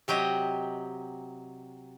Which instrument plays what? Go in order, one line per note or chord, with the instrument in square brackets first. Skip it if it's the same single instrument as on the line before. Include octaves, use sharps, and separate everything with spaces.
[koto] C3 F#3 G4 D#5